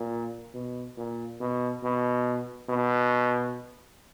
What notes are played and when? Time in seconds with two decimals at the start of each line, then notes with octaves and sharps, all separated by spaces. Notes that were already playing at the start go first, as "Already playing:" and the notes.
Already playing: A#2
0.54 B2
0.97 A#2
1.40 B2
1.84 B2
2.69 B2